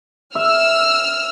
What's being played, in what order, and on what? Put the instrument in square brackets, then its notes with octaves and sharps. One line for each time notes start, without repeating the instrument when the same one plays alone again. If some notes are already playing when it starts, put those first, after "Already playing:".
[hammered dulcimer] E5 [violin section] E6 F6